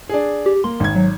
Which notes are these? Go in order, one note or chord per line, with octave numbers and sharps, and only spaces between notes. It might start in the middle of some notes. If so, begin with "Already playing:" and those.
D4 G#4
G4
A#3 C6
G#1 G#6
F#3